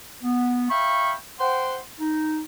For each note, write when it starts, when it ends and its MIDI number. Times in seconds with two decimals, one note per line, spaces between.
0.23 0.67 59
0.70 1.13 76
0.70 1.13 77
0.70 1.13 79
0.70 1.13 83
0.70 1.13 85
1.40 1.77 72
1.40 1.77 78
1.40 1.77 79
1.40 1.77 84
2.00 2.41 63